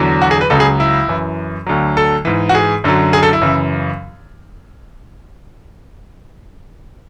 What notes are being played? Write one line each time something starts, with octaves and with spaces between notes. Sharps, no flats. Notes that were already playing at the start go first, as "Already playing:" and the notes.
Already playing: E2 D3 F#3
F#4
G#4
B4
C#2 C#3 F#3 A4
G#4
E4
F#2 E3
D2 D3 F#3
A4
G#2 E3
F#4
G#4
F#2 D3 F#3
G#4
A4
E4
F#2 C#3 E3